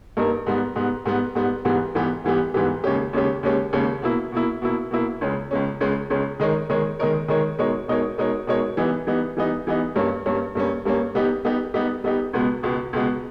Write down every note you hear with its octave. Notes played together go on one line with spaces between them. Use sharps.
G2 G3 A#3 D#4 A#4
G#2 G3 B3
G#2 G3 B3
G#2 G3 B3
G#2 G3 B3
G#2 E3 G3 B3 G4
G#2 E3 G3 B3 G4
G#2 E3 G3 B3 G4
G#2 E3 G3 B3 G4
D#2 C#3 G#3 C#4 G4
D#2 C#3 G#3 C#4 G4
D#2 C#3 G#3 C#4 G4
D#2 C#3 G#3 C#4 G4
B2 A#3 E4
B2 A#3 E4
B2 A#3 E4
B2 A#3 E4
C#2 C#3 G#3 C#4
C#2 C#3 G#3 C#4
C#2 C#3 G#3 C#4
C#2 C#3 G#3 C#4
D#3 G#3 D#4 A#4 C#5
D#3 G#3 D#4 A#4 C#5
D#3 G#3 D#4 A#4 C#5
D#3 G#3 D#4 A#4 C#5
B2 G#3 D#4 A#4 C#5
B2 G#3 D#4 A#4 C#5
B2 G#3 D#4 A#4 C#5
B2 G#3 D#4 A#4 C#5
E3 G3 B3 D#4
E3 G3 B3 D#4
E3 G3 B3 D#4
E3 G3 B3 D#4
G2 G3 A#3 C#4
G2 G3 A#3 C#4
G2 G3 A#3 C#4
G2 G3 A#3 C#4
G3 B3 D#4 G4
G3 B3 D#4 G4
G3 B3 D#4 G4
G3 B3 D#4 G4
C#2 B2 G#3 B3
C#2 B2 G#3 B3
C#2 B2 G#3 B3